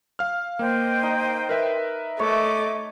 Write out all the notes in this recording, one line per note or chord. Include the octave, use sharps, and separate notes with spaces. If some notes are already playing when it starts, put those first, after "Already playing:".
F5 F6
A#3 C5 D#5 G5
D#4
A#4 B4 E5
A3 C#5 D#5 D6